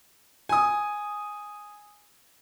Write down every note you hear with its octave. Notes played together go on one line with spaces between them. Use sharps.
G#5 D#6